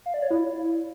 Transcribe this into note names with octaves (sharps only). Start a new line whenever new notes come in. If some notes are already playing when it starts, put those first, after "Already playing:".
F5
D5
C#5
E4